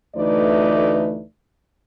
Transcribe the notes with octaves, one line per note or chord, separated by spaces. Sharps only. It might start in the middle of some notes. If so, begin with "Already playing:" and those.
D2 E3 A3 D#4 B4 D5